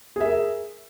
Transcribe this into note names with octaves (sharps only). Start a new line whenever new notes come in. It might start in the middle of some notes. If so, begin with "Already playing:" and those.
G#4 A#4 E5